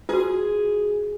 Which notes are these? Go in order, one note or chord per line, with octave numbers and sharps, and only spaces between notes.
F4 F#4 G#4